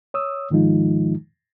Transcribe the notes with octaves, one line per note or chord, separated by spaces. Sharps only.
C#5 D#6 E6
G#2 D#3 F3 G#3 D#4 F4